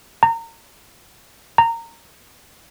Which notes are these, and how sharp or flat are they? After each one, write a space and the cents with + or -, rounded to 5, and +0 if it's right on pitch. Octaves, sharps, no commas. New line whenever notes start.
A#5 -30
A#5 -20